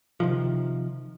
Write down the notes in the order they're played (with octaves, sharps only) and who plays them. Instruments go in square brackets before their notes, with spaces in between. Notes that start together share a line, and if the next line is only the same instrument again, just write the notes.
[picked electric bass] C3 D#3 F3